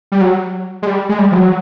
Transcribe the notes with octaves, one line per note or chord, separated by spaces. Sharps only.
G3
F#3
G#3
G3
G#3
G3
F3
F#3